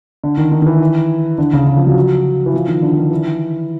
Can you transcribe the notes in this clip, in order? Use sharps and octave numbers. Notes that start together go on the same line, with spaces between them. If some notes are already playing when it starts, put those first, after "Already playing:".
D3
D#3
D#3
D#3
E3
D3
C#3
C#3
F3
F#3
E3
F3
D#3
D3
D#3
E3